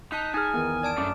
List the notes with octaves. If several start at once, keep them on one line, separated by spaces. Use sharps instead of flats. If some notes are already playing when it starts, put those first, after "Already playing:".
D#4 A5 F#6 B6
D#4 G#4 G#5 D#6 F6
E2 D#3
D5 A5 D7
F#2 A3 D4 D6